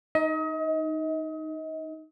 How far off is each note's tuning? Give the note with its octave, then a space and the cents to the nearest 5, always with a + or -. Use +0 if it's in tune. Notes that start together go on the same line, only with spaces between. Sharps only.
D#4 +0 D#5 +35